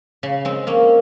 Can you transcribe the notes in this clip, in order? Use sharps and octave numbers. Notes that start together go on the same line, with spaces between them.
C#3
G#3 C4
A#3 C#4